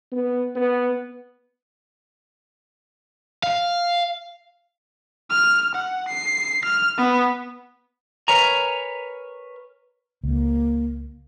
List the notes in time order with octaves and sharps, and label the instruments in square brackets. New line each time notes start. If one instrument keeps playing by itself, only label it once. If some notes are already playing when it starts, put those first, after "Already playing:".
[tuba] B3
B3
[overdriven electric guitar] F5
[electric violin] F6
F#5
C7
F6
B3
[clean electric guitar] A#4 B4 C#5 G#5 A#5
[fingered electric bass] C#2 [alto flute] A#3